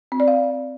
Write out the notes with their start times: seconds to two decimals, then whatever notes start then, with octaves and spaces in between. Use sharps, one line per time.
0.12 C4
0.20 D5
0.28 F5